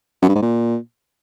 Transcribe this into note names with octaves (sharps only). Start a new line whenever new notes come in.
F#2
G2
G#2
A#2